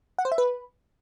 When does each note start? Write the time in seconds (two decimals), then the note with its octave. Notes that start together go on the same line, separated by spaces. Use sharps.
0.18 F#5
0.25 C5
0.32 E5
0.38 B4